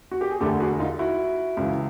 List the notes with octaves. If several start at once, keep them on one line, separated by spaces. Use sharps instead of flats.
F#4
G4
G#4
E1 D2 D3 G4 A4
F#4 G#4
D#4 F4
E4 F#4
C#2 C#3 E3